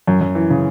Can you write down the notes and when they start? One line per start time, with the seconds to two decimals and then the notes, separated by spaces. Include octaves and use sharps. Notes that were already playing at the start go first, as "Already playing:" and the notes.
0.07 F#2
0.21 F#2
0.35 E3
0.50 C#3